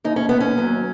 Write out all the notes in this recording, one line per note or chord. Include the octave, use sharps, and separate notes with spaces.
D#2 D#4
C#4
D#2 B3
C#4
F#3